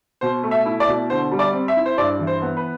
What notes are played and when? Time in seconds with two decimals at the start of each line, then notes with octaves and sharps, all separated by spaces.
0.21 B2 C5
0.43 A3
0.51 E5
0.66 E4
0.80 D5
0.88 B2
1.10 D3 C5
1.31 G3
1.39 D5
1.53 C4
1.68 E5
1.77 E4
1.86 C5
1.98 G2 D5
2.19 E3
2.27 C5
2.42 B3
2.57 B4